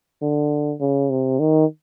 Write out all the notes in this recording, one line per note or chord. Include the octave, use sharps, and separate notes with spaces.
D3
C#3
C3
D#3